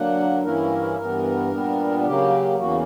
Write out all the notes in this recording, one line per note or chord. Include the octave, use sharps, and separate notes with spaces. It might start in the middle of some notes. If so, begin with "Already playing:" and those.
Already playing: D3 F#3 A#3 D4 F#5
G2 E3 A#3 C#4 E4 A#4
G2 E3 B3 A#4
A#2 G3 B3 D4
C#3 F#3 A#3 G4
E2 C#3 E3 A#3 F#4